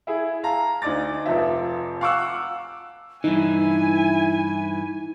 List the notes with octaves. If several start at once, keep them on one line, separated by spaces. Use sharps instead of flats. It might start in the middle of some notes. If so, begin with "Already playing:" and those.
E4 G#4
F5 A5 A#5
D2 D#4 D5 D6 A6
F1 F3 C4 E5
F5 F#5 C#6 D6 E6 F#6
G2 E3 D#4 E4 G#5